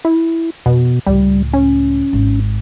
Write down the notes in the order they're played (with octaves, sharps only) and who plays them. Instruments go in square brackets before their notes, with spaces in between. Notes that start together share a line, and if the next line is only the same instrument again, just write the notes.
[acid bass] E4
[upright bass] F2 [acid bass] B2
[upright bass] C#2 A2 [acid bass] G3
[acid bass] C#4
[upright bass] G#1